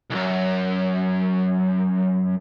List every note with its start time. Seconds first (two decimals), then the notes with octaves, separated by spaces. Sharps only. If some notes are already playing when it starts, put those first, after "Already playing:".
0.11 B1 F#2